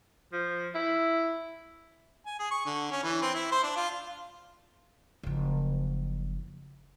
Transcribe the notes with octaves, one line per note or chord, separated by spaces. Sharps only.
F3
E4
G#5
G#4
C#6
D3
C#4
E3
C4
E4
C5
D4
F4
F#1 F3